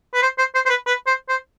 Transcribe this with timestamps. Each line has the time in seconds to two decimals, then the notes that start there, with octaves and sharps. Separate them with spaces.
0.14 B4
0.22 C5
0.38 C5
0.55 C5
0.65 C5
0.69 B4
0.86 B4
1.07 C5
1.29 C5